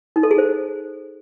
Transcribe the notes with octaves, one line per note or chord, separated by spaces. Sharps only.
D#4
A4
G#4
C5